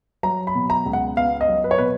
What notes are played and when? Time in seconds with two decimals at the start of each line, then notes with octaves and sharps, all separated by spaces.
0.23 F#3 A#5
0.47 B5
0.55 B2
0.70 A#5
0.86 C#2
0.93 F#5
1.17 B3 F5
1.41 D#5
1.49 F#3
1.64 B4
1.71 C#5
1.78 B2 B4